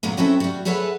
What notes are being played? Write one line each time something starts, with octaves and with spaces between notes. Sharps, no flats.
A#2 D3 F#3 B3
C4 C#4 E4 F#4 A4 E5
G3 F#4
G#4 A4 B4 C#5 E5 F#5